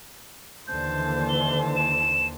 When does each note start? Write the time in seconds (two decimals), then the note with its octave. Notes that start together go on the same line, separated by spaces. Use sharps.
0.68 D#2 D3 E3 C5 A5 G6
1.29 G7
1.76 E7